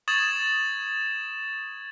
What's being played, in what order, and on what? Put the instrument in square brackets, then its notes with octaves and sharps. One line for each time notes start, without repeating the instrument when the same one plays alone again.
[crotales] C#6 D#6 G#6 A6 E7 F#7